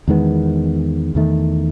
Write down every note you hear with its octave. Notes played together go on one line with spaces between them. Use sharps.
E2 D#3 G#3 B3
E2 D#3 A3